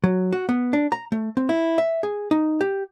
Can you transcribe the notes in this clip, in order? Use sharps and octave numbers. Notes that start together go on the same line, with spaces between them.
F#3
F#4
B3
D4
A#5
A3
C4
E4
E5
G#4
D#4
G4